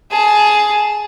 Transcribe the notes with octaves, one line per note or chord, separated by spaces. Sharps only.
G#4 A5